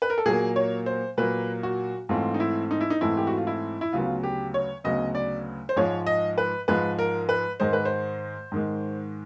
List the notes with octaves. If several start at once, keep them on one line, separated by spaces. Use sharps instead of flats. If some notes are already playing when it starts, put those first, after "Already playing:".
B4
A#4
A4
A#2 F#3 A#3 G#4
C#5
C5
A#2 F#3 A#3 B4
F#4
G#2 E3 A3 C4 F4
D#4
E4
D#4
E4
D#4
G#2 E3 A3 C4 E4
G4
F#4
F4
E4
E4
D2 C#3 F#3 B3 F4
G4
C#5
D2 C#3 F#3 B3 D#5
D5
C5
G#2 F3 G#3 C#5
D#5
B4
G#2 F3 G#3 B4
A#4
B4
G#2 D#3 G#3 C5
B4
C5
G#2 D#3 G#3